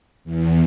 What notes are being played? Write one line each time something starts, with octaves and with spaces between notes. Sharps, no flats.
E2